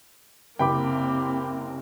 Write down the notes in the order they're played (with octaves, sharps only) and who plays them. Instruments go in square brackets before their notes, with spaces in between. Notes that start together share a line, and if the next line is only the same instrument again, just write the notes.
[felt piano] F#1 C2 [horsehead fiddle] A#3 C4 [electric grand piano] G5 B5 D6